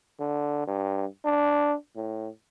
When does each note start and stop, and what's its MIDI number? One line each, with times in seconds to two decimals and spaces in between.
0.20 0.67 50
0.67 1.05 43
1.25 1.75 62
1.96 2.28 45